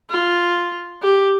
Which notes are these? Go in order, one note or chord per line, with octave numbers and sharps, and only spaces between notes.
F4
G4